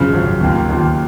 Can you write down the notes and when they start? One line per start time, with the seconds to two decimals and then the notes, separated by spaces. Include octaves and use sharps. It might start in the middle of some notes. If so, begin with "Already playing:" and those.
Already playing: G#1 F#2 C#3 F3
0.13 G#1 F#2 F3
0.41 D#2 D#3 A#3 F4
0.69 D#2 D#3 A#3 F4